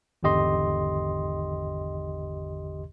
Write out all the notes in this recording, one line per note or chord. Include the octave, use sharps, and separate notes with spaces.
G#1 E2 D3 G4 D#5 C6